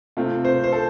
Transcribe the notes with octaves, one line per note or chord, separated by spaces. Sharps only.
C3 A3 C4 F4
C5
C5
A4